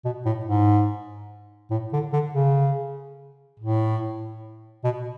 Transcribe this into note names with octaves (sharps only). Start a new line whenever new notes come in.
B2
A2
G#2
A2
D3
D3
C#3
A2
B2